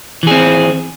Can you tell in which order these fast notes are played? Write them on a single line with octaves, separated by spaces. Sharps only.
E3 G#4 C4